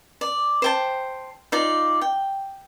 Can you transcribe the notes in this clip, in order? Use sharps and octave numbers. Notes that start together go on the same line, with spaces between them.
D5
C5 G5 A5
D#4 F4 D5
G5